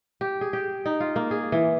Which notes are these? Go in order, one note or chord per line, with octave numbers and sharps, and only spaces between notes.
G4
G#4
G4
D#4
F4
A#3
G#4
E3